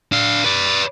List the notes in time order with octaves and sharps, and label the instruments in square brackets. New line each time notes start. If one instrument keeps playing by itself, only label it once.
[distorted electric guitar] D4 F5
B4 D5